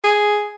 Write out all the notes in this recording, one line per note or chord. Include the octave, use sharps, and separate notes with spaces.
G#4